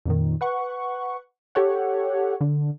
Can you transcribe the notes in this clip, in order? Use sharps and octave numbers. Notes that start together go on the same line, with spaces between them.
F2 A#2 D#3
B4 F#5 C#6
G4 A4 C#5 F#5
D3